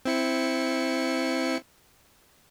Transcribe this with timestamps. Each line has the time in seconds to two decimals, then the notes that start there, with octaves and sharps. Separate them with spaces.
0.05 C4 E4 C#7